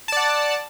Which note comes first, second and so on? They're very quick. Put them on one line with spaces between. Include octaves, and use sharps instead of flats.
A5 D5 F#5